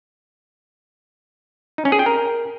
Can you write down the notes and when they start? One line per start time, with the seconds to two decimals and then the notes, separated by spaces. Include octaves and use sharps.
1.78 D#4
1.85 C#4
1.92 G#4
1.99 G5
2.06 A#4